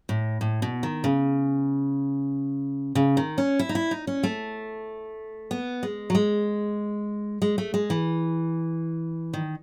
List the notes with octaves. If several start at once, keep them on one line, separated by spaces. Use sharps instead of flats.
A2
A2
B2
D#3
C#3
C#3
D#3
C#4
E4
D#4
E4
D#4
C#4
A3
B3
G#3
F#3
G#3
G#3
A3
G#3
E3
D#3